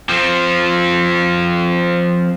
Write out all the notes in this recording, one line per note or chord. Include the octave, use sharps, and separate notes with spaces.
F3 C4